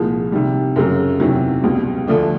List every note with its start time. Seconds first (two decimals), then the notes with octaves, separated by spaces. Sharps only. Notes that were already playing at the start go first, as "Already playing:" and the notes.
Already playing: C2 A#2 F3 G#3
0.32 C3 D#3 G3
0.76 F#2 C#3 F#3
1.20 E2 C3 D#3 F#3
1.64 C#2 B2 G3
2.07 D2 D3 F3 A3 D4